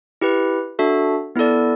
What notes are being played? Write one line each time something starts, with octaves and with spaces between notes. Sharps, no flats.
E4 G4 B4
D4 F#4 A4 E5
B3 E4 A4 D5